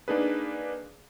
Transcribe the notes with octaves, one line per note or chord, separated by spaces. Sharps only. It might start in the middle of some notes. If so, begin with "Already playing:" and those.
A#3 D4 D#4 G#4 B4